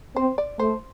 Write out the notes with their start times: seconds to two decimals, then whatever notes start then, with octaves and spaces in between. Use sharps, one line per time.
0.16 C4 C5
0.38 D5
0.59 A3 C5